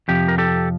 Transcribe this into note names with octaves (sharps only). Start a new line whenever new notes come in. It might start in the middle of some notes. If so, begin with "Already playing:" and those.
F2 C3 F3 G4
A#4
G4 A4